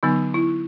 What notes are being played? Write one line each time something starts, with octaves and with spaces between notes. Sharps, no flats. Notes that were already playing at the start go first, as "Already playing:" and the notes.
D3 F#3 B3 D#4
E4